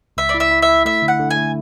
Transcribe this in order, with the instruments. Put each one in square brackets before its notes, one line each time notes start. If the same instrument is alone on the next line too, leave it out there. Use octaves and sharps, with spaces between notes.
[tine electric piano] C#2 [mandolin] E5
[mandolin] D5
[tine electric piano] E4
[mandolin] E5
[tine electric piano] E4
[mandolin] E5
[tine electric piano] E4
[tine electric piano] A3 [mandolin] E5
[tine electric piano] D3
[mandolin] F#5
[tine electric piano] D3
[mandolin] G#5
[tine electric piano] A3